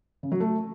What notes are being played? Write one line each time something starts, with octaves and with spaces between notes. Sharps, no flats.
C#3
F#3
A3